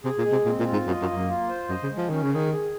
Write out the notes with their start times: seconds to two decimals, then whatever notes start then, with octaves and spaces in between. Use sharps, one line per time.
0.04 C3 G#4
0.18 A#2
0.25 G#3
0.32 C3
0.46 A#2 C4
0.59 A#2
0.67 F4
0.73 G#2
0.87 F#2 D#5
1.01 F#2
1.08 A#3
1.15 F#2
1.29 F4
1.49 C5
1.69 F#2 D#5
1.83 C#3
1.90 G#3
1.97 F3
2.09 D#3 C#4
2.23 C#3
2.32 D#3 G#4
2.52 G#4